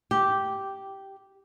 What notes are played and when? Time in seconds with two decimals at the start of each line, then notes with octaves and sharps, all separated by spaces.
0.11 G4